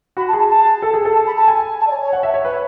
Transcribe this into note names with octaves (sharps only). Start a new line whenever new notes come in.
F#4 B5
A5
G#4
A5
A5
A4
G#4
A4
A5
B5
A5
G#5
A5
D5
C#5
C#5
F#5
E5
C#5
B4 C#5